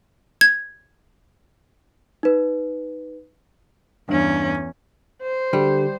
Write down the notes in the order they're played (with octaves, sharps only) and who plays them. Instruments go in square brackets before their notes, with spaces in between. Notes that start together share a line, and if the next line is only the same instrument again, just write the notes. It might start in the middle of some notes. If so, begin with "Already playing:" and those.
[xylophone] G#6
[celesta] D#4 B4
[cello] E2 C#4 [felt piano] G2
[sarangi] C5
[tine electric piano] D3 [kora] G3 [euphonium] G4